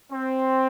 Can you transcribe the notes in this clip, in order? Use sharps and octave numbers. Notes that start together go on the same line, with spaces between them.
C4